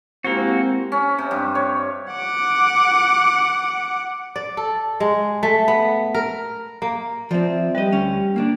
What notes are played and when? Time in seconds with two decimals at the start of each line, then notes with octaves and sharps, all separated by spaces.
0.25 G#3 A#3 C4 E4 F#4 G4
0.92 C#4
1.18 C3
1.31 G2
1.55 C#5
2.11 F#5 D6
4.36 D5
4.57 A4
5.00 G#3
5.43 A3
5.68 B3
6.14 A#4
6.82 A#3
7.31 F3 C4 D5 E5
7.75 G3 G4 B4 D#5
7.92 D2 C#4
8.36 A#3 D4 D5